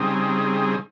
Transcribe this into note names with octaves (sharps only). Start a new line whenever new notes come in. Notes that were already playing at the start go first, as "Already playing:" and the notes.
Already playing: C#3 G3 C4 D#4 G#4